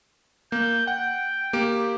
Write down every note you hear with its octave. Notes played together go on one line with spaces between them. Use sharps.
A#3 G6
F#5 G5
A#3 G4 D7